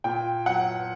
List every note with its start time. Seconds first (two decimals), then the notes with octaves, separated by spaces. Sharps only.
0.04 A#2 G5
0.46 F#3 F#5